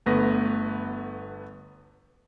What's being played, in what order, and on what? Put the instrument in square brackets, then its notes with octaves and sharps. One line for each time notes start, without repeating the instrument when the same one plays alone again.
[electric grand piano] G1 A3 B3 B4 A#6